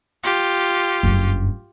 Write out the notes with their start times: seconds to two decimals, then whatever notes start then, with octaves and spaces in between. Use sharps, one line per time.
0.23 F4 G4
1.03 F#1 G2